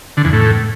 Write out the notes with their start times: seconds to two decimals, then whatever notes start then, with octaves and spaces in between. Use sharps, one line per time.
0.17 D3
0.25 E2
0.33 A2